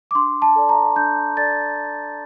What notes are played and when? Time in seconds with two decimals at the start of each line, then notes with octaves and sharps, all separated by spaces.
0.11 D6
0.15 D4 C6
0.42 A5
0.56 A4 D5
0.69 A#5
0.96 D4 G6
1.37 A4 D5 A6